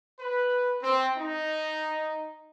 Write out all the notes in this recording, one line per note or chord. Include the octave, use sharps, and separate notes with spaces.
B4
C4
D#4